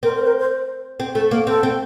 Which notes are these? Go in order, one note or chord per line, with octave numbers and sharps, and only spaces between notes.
C4 A#4
A#4
C5
A#4
C5
C4
A3
A#3
C4 A4
C4